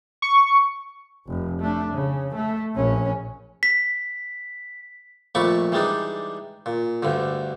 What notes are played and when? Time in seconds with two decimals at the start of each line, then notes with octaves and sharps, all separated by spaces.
0.22 C#6
1.28 F1
1.60 A3 D4
1.94 C#3
2.35 A3
2.75 A#1 C#4
3.63 B6
5.35 F2 A#2 A3 B5 C#6 D6
5.72 E3 G3 G#3 D4 D#4
6.66 A#2
7.03 D2 G2 D3